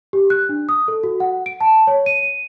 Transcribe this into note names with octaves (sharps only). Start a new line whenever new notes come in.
G4
F#6
D4
D#6
A4
F#4
F#5
D7
A5
C#5
D#7